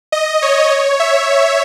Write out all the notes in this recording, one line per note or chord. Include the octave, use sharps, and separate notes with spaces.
D#5
C#5
E5